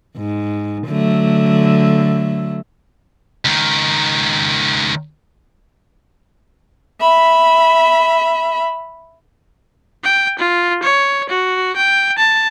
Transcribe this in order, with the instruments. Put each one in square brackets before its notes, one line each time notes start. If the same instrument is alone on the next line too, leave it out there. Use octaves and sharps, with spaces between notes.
[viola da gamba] G#2
D3 F#3 A3
[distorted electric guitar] C#2 D#3
[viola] E5 B5
[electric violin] G5
F4
C#5
F#4
G5
A5